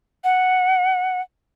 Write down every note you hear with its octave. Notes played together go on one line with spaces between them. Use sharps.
F#5